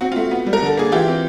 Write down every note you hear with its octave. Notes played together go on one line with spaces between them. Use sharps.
C4 F#4
F4
A3 F#4
B3
G3
A#4
D3 A4
A#3 G#4
E3 F4 G4
C4